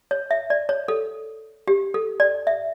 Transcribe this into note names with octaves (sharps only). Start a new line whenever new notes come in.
C#5
E5
D5
C#5
A4
G4
A4
D5
E5